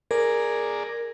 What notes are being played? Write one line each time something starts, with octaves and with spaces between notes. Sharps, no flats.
G#4 A#4 D5 A#5